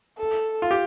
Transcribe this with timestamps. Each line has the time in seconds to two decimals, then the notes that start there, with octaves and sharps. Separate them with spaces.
0.18 A4
0.62 F4
0.71 G4